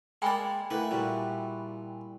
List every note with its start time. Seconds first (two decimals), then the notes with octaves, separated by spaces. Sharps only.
0.22 G#3 A#3 D5 G5 G#5 B5
0.71 A3 A#3 E4 B4 F#5
0.91 A#2 G3 E4 F#4